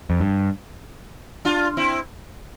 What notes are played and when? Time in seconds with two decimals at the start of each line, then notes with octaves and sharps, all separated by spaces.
0.10 F2
0.20 G2
1.45 D4 F4
1.77 C4 E4